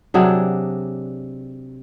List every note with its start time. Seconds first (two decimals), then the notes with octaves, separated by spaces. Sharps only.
0.14 C3 F#3 D4 G#4